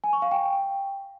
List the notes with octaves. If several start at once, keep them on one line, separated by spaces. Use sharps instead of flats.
G#5
C#6
F5
G5